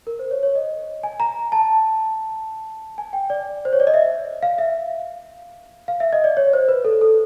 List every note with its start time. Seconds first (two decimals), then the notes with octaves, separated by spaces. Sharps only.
0.07 A#4
0.19 C5
0.31 C#5
0.43 C#5
0.55 D#5
1.03 G#5
1.20 A#5
1.52 A5
2.98 G#5
3.13 G5
3.30 D5
3.65 C5
3.73 C#5
3.80 D5
3.87 D#5
3.94 E5
4.43 F5
4.58 E5
4.75 F5
5.88 F5
6.00 E5
6.13 D#5
6.24 D5
6.37 C#5
6.53 C5
6.68 B4
6.85 A4
7.01 A4